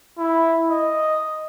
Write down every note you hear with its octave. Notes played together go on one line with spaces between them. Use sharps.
E4
D#5